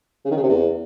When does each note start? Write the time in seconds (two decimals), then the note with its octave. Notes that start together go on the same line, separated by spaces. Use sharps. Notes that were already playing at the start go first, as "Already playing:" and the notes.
0.25 C#3
0.31 D#3
0.37 C#3
0.43 C3
0.48 E2